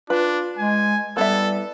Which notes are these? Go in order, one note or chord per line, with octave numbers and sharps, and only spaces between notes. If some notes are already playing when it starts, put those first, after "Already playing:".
D4 F4 B4
G#3 G#5
G3 B3 E4 A4 E5